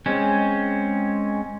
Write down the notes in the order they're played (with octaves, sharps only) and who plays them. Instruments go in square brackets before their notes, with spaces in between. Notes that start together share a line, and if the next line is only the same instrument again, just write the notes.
[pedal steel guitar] G#3 C4 C#4